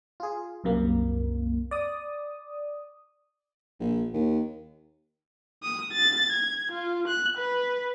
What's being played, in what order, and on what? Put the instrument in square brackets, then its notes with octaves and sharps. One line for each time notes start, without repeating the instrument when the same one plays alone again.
[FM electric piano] F4 G#4
C2 F#2 C3 A#3
D5 D#6
[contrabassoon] A#1
D#2
[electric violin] D#6
A6
G#6
F4
F#6
B4